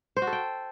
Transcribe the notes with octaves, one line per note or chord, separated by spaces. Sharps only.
C5
F#4
A4
G5